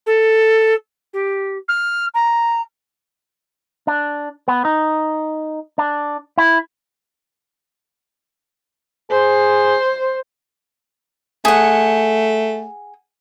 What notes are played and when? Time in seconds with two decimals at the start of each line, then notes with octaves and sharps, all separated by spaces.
0.06 A4
1.13 G4
1.68 F6
2.14 A#5
3.87 D4
4.48 B3
4.65 D#4
5.78 D4
6.38 E4
9.11 G#4 C5
11.45 A3 G#4 F#5